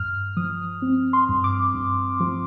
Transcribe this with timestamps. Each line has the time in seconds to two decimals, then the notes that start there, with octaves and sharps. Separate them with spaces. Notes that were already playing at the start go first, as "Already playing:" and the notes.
Already playing: G2 F6
0.37 F3 D#6
0.82 C4
1.13 C6
1.29 G2
1.44 D6
1.74 G2
2.20 F3